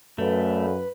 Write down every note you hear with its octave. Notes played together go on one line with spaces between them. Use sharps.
F#2 A3 A4 B4 D5 F5